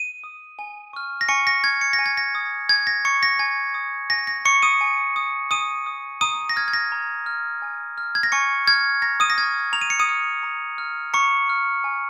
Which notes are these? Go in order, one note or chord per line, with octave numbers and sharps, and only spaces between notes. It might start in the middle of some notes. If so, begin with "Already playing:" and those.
Already playing: D#7
D#6
G#5
C#6 F6
A#6
G#5 C#6 C#7
A#6
C#6 F6 G#6
C#7
A#6
G#5
G#6
A#6
D#6
G#5 G#6
A#6
C#6 D#6 C#7
A#6
G#5 G#6
D#6
G#5 A#6
A#6
C#6 D#6 C#7
D#6 D#7
G#5
D#6
G#5 D#6 D#7
D#6
A#5 D#6 D#7
A#6
F6 G#6
G#6
A#6
A#5
F6
G#5
F6
G#6
A#6
G#5 C#6 C#7
F6 G#6
A#5 A#6
D#6 D#7
A#6
F6 G#6
C#6
A#5 F7
D#7
C#7
D#6 D#7
C#6 F6
A#5
F6
A#5 C#6 C#7
F6
G#5